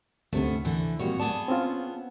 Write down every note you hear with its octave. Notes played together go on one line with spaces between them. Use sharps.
D2 C3 A3 B3 C#4
D3 E3
F2 A#2 G3 F#4 C#5
B3 G#4 D5 A5
C4 C#4 F4